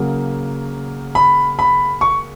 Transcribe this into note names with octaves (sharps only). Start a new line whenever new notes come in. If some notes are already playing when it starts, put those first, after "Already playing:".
Already playing: C#3 F#3 A#3
B5
B5
C#6